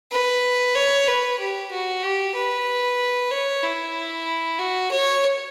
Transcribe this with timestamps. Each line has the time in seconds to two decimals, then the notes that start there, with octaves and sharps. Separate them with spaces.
0.12 B4
0.75 C#5
1.07 B4
1.39 G4
1.71 F#4
2.03 G4
2.35 B4
3.31 C#5
3.63 E4
4.59 F#4
4.91 C#5